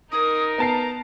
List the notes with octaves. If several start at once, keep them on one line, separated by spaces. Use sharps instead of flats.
D#4 A#4 D#6
B3 A5 A#5 C7